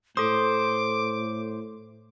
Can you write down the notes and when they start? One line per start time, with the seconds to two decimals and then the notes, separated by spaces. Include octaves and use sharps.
0.17 A2 A4 C5 D6 D#6